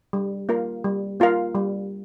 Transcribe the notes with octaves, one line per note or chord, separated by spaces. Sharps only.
G3
A#3 F4 A#4 F5
G3
A#3 F4 A#4 F5
G3